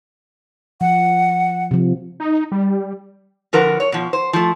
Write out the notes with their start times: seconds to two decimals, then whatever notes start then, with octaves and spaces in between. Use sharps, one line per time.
0.81 F3 F#5
1.71 C3 F3
2.20 D#4
2.52 G3
3.53 D3 F3 F#4 A#4 B4
3.80 C#5
3.92 B2 F3
4.13 C5
4.33 F3 A3